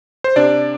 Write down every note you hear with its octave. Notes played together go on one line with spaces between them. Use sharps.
C5
C3 D4 D5